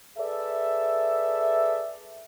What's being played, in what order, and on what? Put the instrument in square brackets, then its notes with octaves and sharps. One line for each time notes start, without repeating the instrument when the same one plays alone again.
[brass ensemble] G#4 A4 B4 D5 E5